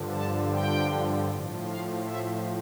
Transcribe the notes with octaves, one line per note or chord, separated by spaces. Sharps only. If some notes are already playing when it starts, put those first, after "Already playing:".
Already playing: G2 D3 F3
A5
G5
A2 F3
F5
E5